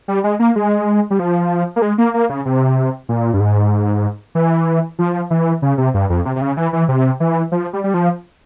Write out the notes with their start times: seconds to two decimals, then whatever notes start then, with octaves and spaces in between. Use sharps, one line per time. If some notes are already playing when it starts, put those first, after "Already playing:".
0.08 G3
0.24 G#3
0.39 A#3
0.56 G#3
1.11 G3
1.19 F3
1.76 A#3
1.82 G#3
1.98 A#3
2.14 A#3
2.29 C#3
2.45 C3
3.09 A#2
3.34 G2
3.40 G#2
4.35 E3
4.99 F3
5.30 E3
5.62 C#3
5.78 C3
5.94 G2
6.10 F2
6.25 C3
6.36 C3
6.41 C#3
6.57 E3
6.73 E3
6.89 C3
7.20 E3
7.52 F3
7.73 G3
7.84 G3
7.94 F3